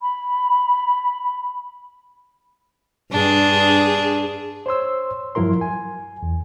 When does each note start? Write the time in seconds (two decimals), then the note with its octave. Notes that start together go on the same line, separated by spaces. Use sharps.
0.02 B5
3.12 G2 D4 G#4
4.66 C5 C#5 C6 E6
5.35 G2 F3 F#3 E4 A#4 C6
5.61 G#5
6.23 E2